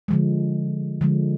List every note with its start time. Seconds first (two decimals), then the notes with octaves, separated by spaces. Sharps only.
0.08 D3 F3 G#3
1.01 D3 F3 G#3